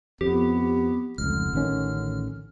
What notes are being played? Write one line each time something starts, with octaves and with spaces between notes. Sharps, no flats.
F2 B3 G4
F1 C#2 D3 F6
A1 D#3 C#4